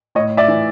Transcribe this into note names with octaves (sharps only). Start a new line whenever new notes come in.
A2 C#5 D#5
D5 E5
E3